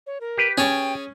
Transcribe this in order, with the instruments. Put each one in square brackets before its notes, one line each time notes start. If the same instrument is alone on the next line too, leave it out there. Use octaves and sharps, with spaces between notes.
[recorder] C#5
A#4
[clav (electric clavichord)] G4 B4
[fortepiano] C#4 [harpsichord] G#4 C#5 A5 [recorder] G5